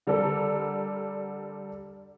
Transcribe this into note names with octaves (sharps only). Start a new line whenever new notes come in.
D3 G3 D4 A4 A#4